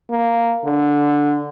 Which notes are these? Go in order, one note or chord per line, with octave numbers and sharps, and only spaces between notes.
A#3
D3